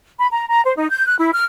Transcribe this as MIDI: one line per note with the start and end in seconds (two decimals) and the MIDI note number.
0.19 0.28 83
0.32 0.47 82
0.50 0.62 82
0.64 0.74 72
0.77 0.90 63
0.90 1.05 91
1.06 1.16 90
1.18 1.30 64
1.33 1.43 89